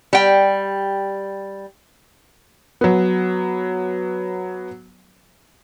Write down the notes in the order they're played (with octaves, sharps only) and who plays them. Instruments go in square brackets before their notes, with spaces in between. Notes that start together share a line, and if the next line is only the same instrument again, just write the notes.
[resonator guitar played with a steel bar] G3 G5
[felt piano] F#3 B3